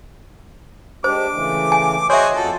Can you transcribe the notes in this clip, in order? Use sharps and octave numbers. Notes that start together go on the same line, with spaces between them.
G#3 D4 G4 C5 D6
C#3 E3 A3
G#5
F#4 G#4 C5 C#5 D#5 E5 G#5
F2 F4 F#4 A4